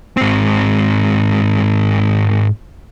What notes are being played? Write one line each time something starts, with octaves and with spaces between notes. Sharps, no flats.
G#2 C4